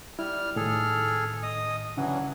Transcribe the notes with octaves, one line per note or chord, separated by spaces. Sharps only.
G3 E4 F6
A2 D#3 G#4 A4 F6
D#5 D#6
G2 C#3 E3 F#3 C#4 F#5